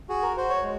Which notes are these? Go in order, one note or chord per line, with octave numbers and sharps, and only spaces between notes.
F#4 G#4
A#4
F#4 C5
C#5
G#3